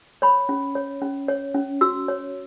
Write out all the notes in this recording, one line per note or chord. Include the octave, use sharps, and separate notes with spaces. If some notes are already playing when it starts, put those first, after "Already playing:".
C#5 B5
C#4
C#5
C#4
C#5
C#4
F#4 E6
C#5